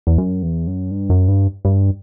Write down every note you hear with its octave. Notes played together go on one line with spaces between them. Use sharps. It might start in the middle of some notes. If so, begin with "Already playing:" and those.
E2
F#2
E2
F#2
G2
F#2
G2
G2